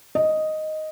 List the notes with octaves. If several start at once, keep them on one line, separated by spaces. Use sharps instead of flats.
D#5